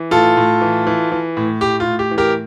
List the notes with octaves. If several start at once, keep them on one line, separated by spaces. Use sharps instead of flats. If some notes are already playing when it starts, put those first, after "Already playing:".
Already playing: E3
A2 F4 A4
A2
E3
E3
E3
A2
A2 G4
F4
A2
G4
E3
G4 A#4